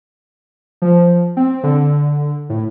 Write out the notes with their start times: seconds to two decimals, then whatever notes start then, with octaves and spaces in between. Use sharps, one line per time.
0.82 F3
1.37 C4
1.63 D3
2.50 A2